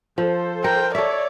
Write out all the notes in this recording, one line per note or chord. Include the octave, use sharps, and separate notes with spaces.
F3 A4 C5
A#4 G5
A4 C#5 D5 E5